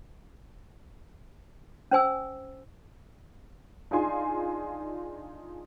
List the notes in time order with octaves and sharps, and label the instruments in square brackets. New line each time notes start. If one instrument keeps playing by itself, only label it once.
[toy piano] C#4 C5 G#5 E6
[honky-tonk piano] D4 D#4 F4 G#4 G#5 C6